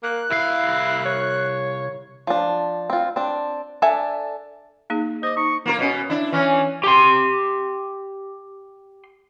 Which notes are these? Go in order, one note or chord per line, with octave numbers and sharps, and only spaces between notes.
A#3 F#6
C2 E4 F5
C#5
F3 D4
C4 F4
C4 D4
D4 A4 E5 G#5
A#3 D#4 G#4
C5 D#5 D6
D#4 C#6
A#3 F4 A#4
B2 C#4
D4 E4
E3 C#4
G4 C6